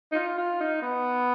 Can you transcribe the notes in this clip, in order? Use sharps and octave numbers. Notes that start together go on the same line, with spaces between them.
D#4
F4
F4
D#4
B3